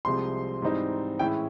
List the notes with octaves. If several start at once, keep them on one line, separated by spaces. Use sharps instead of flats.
C2 C3 F3 G#3 C4 C6
G#2 E3 G3 C4 D#4
A2 E3 G#3 C#4 E4 G5